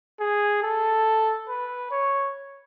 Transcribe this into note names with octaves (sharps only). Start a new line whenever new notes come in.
G#4
A4
B4
C#5